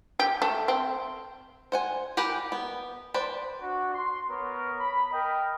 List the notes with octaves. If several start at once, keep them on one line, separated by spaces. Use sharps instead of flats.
G4
A3
C4
C5 F#5 G#5
G4 A#4 B4 G5 G#5
B3
B4 C5 D5
D4 F#4
C6
B3 A#4 C#5
B5
A#4 D#5 G5